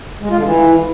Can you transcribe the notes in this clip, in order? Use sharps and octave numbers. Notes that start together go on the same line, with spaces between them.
G#3
F4
D3
E3